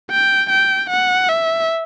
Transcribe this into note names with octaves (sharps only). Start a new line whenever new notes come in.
G5
G5
F#5
E5